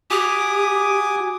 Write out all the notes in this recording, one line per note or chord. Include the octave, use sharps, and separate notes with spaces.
F#4 G4 G#5 D6 D#6